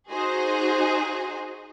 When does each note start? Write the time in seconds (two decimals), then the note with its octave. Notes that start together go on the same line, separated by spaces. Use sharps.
0.10 D#4 F#4 G#4 C5